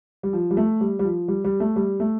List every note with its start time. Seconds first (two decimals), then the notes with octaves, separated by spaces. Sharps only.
0.23 G3
0.33 F3
0.51 G3
0.57 A3
0.81 G3
0.99 G3
1.04 F3
1.28 G3
1.44 G3
1.60 A3
1.76 G3
2.00 A3